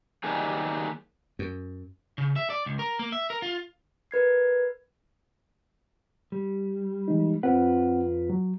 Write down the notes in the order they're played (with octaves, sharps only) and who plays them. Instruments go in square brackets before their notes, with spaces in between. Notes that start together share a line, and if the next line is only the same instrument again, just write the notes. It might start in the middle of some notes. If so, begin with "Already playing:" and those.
[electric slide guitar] D#3 F#3 G3 A#3 G#4
[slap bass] F#2
[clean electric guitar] C#3
E5
D5
C#2
A#4
A#3
E5
A#4
F4
[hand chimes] A#4 B4 G#6 C7
[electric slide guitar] G3
[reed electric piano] E3 G#3 D#4
[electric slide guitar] F2 F4 B4 [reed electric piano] C4 F#5
[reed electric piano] F#3